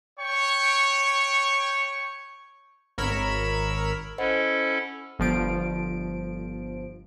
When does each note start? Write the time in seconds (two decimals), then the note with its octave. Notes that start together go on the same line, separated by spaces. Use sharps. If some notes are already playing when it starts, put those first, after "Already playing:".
0.20 C#5 G5 C#6
2.98 G#1 A#4 C#5 B5 E6
4.18 C#4 E4 A4 C5 D#5 F#5
5.19 G1 F3 D7